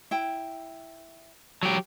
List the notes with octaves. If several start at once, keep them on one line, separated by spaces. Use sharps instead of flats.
E4 G5
F#3 G4